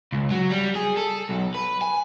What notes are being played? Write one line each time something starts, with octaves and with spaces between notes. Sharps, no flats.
C#2
F#3
G3
G#4
A4
B1
B4
G#5